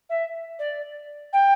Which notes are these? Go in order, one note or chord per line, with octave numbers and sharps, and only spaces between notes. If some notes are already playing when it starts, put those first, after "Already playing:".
E5
D5
G5